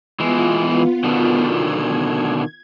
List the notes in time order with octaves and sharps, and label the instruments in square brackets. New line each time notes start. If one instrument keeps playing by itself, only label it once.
[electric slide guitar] E3 G#3 [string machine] B3 F4
[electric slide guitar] B2 D3 D#3
[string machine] G#6